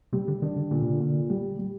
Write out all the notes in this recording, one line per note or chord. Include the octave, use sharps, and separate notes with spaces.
C3 G3
D3
D#3 D4
D3
A#2 D3
C3
D3
A#2
G3
G3